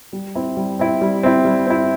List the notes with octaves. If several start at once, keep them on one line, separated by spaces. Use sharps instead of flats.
G3
C4 E4
G3
C4 E4
G3
C4 E4
G3
C4 E4